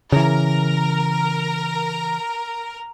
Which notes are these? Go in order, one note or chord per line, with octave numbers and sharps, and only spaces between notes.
C#3 E3 A#4